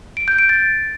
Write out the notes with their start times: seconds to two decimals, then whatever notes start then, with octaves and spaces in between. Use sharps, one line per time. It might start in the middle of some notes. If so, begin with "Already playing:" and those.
0.17 D7
0.28 G6
0.39 D7
0.49 A6